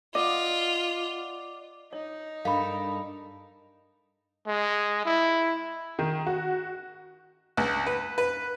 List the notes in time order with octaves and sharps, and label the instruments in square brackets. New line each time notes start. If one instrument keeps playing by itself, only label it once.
[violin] F4 [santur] D5 F#5 [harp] D#5
[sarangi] D#4 [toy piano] C#5
[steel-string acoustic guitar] G2 A4 A#4 [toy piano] F5 B5
[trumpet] G#3
E4
[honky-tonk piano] D#3
F#4
[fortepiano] C#2
B4
B4